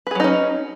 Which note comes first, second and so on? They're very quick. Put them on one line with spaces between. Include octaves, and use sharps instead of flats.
B4 G#4 F#3 D#4 C#4